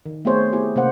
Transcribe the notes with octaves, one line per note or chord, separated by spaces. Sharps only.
D#3
A3 B3 C4 G#4 C5 C#5
B3 E4 G4 G#4
C3 A#3 C#4 C5 F#5